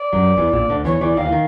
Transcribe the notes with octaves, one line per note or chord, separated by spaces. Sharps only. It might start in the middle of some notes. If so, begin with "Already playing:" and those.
Already playing: D5
F#2 F#3
E2 E3
A#1 A#2
D2 D3
E2 E3 C#5
E2 E3 D5
D#2 D#3 F5
E3
D#3